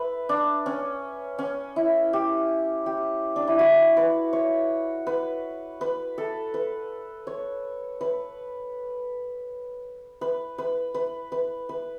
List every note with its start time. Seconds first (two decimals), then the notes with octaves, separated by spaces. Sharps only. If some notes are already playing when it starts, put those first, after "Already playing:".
Already playing: B4 E5
0.29 D4
0.66 C#4
1.39 C#4
1.76 E4
2.13 G4
2.86 G4
3.36 D4
3.47 E4
3.59 F#4
3.97 B4
4.33 C#5
5.07 B4
5.81 B4
6.18 A4
6.54 B4
7.27 C#5
8.01 B4
10.21 B4
10.58 B4
10.94 B4
11.32 B4
11.69 B4